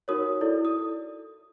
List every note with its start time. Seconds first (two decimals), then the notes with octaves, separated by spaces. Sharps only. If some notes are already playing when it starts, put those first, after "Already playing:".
0.08 D#4 F#4 A#4 C#5 D#6
0.41 E4 A4 D5
0.65 D#6